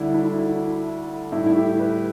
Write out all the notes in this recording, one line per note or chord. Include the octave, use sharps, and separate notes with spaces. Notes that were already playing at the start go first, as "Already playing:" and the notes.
Already playing: D2 D3 G3 D4 E4
E4
E4
A2 G3 E4
E4
G4
B4